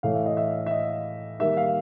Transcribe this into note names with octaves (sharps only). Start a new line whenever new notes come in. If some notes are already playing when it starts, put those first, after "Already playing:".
A2 E3 A3 F5
E5
D#5
E5
E5
D#5
D#3 G3 A#3 E5
F5